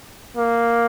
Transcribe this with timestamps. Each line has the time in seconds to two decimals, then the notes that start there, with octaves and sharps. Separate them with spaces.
0.37 A#3